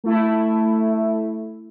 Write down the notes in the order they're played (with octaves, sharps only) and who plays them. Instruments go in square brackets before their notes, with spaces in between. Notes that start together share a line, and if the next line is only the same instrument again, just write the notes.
[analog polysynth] A3 E4